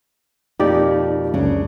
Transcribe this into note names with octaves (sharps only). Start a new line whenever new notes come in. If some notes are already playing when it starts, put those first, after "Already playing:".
F2 B2 A#3 D#4 G4 D5
C#2 F#2 C#3 D4